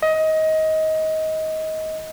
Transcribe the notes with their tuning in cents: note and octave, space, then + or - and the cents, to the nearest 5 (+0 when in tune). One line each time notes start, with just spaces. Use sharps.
D#5 +20